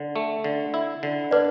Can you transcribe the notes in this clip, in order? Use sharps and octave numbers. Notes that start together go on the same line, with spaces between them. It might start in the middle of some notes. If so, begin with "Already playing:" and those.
Already playing: D3
A3
D3
E4
D3
D4 B4 D5